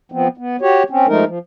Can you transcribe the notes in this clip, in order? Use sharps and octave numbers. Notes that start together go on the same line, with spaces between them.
F3 B3 C4
B3
F#4 G4 C#5
C4 C#4
F3 G#3 A3 D#4 A#4
F3